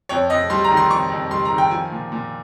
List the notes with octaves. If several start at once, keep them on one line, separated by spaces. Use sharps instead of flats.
F2 C#5
F2 D#5
G3 C6
A#5
D#3
C6
F2 C#6
F2
G3 C6
A#5
D#3
G5
F3 G#5
A#2
A#2